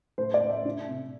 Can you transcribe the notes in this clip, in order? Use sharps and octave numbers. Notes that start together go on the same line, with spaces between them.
A2 C5
D5
A2
E5
D4
C3